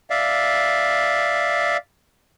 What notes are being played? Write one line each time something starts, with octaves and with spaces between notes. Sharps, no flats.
D5 E5 F5